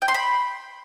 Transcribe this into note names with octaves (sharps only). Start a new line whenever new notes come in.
G5
C6
B5